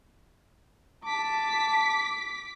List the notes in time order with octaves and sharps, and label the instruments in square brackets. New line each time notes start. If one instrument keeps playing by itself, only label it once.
[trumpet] A5 [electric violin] D6 B6